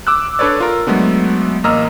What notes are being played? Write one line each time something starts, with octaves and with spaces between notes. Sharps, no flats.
D6 E6 F#6
D4 A4 B4 C#5 D5
F4 A#4
F#3 G#3 A3 B3 D4
A1 A#3 D#5 A#5 E6 F6